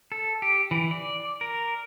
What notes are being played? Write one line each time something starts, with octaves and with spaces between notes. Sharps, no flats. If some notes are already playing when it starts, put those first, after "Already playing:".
A4
G4
E3
D5
A#4